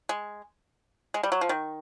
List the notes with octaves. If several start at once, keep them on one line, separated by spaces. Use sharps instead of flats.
G#3
G#3
G3
F#3
F3
D#3